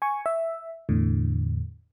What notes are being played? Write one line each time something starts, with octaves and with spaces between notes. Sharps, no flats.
G#5 C#6
E5
E2 A2 D3